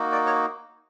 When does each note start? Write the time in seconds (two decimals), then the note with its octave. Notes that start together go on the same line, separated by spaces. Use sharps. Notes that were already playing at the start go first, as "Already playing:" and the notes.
Already playing: A#3 D#4 F#4
0.12 D5
0.26 C#5